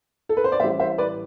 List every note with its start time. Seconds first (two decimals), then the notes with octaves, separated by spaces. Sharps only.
0.29 A4
0.37 B4
0.44 C5
0.52 D5
0.60 A1 A2 G3 C5 E5
0.80 C5 E5
0.98 B4 D5